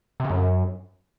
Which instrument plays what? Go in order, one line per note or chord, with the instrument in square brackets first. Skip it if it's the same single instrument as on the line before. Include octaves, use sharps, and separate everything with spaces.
[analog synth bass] C3
C#3
F#2